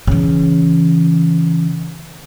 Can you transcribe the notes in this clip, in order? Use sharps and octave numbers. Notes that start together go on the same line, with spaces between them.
C#3 E3